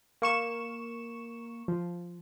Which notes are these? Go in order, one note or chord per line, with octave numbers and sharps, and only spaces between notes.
A#3 C#6 E7
F3